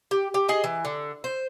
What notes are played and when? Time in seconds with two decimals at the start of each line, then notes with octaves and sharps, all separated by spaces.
0.11 G4
0.34 G4
0.48 G#4 D#5 G#5
0.64 E3
0.85 D3
1.24 C5